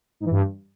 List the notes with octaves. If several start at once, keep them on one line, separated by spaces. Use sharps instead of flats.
G#2
E3
G2